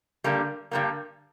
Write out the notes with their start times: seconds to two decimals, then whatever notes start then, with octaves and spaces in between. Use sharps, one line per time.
0.24 G2 D3 G3 A#3
0.71 G2 D3 G3 A#3